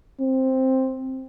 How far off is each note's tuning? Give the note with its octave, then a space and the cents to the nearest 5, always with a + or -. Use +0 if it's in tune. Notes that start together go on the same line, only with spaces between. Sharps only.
C4 +5